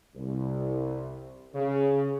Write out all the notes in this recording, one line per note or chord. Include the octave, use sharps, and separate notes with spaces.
C2
C#3